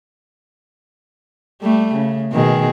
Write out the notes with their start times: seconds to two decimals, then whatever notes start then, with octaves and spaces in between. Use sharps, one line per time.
1.62 G3 A3
1.94 C#3
2.32 B2 D#3 G#4